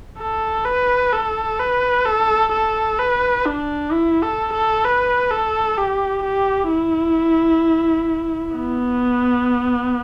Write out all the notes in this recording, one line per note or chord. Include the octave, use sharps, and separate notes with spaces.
A4
B4
A4
B4
A4
A4
B4
D4
E4
A4
A4
B4
A4
G4
G4
E4
B3